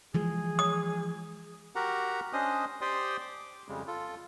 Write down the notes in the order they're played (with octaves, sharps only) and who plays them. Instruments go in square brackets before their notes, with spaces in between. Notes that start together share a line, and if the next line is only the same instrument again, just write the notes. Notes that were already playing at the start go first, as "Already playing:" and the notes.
[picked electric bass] E3 F3 G#3 [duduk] G#4
[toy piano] D#6
[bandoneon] F#4 G4 A#4 F#5 A#5
C#4 D4 C5 D#5 D#6
G4 C5 D5 G5 C6 D#6
D6
F2 C#3 G3 G#3
F4 A4